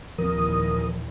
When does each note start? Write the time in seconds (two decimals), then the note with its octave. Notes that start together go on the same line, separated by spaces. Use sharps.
0.18 D#2 A#2 E3 F3 C4 A#4 D#6